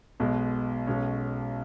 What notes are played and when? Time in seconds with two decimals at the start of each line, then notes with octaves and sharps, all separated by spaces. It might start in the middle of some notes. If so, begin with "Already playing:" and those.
0.20 B1 B2 G#3
0.87 B1 B2 G#3 C#4